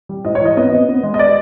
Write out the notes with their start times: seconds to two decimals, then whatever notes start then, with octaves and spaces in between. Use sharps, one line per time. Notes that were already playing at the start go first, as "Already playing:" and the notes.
0.09 G3
0.25 G#2 D#5
0.35 C#5
0.41 E3 D#5
0.57 B3 D#5
0.72 B3
0.89 B3
1.03 G#3
1.14 D#5
1.19 D5